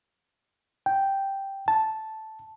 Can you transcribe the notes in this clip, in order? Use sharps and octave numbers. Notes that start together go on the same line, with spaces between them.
G5
A5